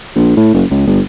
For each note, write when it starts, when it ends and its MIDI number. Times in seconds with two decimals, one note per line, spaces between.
0.16 0.33 34
0.37 0.52 45
0.54 0.64 30
0.71 0.84 37
0.87 1.01 31